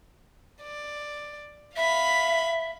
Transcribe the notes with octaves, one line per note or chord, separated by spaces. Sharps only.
D5
E5 F5 B5